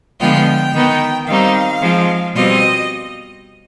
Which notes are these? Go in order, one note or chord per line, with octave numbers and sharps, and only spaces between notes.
D3 F3 G#3 B3 F4 G5
D#3 B3 D#4
D#3 G3 C4 D#4 F5
F3 G#3 C4
B2 G3 C4 F4 D#5